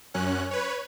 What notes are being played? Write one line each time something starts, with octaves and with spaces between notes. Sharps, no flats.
F#2 C#4 F#6
B4 C#5